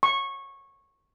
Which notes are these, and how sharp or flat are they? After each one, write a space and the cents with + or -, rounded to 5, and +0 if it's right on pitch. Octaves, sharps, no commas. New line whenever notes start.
C#6 -15